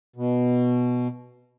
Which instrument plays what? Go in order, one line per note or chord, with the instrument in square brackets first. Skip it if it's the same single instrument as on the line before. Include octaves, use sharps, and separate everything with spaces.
[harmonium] B2